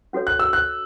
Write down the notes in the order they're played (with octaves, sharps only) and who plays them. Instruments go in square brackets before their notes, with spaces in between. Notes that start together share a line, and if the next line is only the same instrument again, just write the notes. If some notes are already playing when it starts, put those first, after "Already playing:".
[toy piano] C#4 F#4 A4 C#5
[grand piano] F#6
E6
F#6